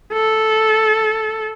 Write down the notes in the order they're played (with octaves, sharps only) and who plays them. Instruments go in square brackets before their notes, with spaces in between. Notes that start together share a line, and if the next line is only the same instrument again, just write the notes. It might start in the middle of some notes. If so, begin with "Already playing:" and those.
[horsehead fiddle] A4